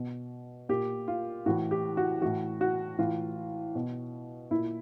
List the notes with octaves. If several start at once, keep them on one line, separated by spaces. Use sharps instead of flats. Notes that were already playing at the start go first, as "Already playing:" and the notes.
Already playing: B2
A#2 G4
F4
A2 E3 F#4
G4
F#4
A2 E3 F#4
F#4
A2 E3 F4
B2
A#2 E4